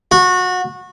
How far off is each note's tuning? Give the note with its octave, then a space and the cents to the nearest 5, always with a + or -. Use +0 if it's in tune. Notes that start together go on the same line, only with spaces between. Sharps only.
F#4 -25